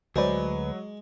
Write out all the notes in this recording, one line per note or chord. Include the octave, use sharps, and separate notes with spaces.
D2 F#3 G#3 B4 C5 D5